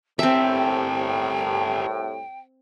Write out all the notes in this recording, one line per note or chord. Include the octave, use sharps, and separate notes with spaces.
C2 A2 C4 G4 A4 E5 G5